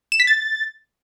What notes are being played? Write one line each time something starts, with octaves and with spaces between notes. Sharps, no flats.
E7
B6
A6